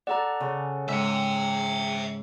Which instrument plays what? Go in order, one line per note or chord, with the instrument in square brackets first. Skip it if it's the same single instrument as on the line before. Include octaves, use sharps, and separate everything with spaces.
[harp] A4 F#5 [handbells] D5 A#5
[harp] C#3
[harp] G#2 [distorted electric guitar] E5 G5 [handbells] E6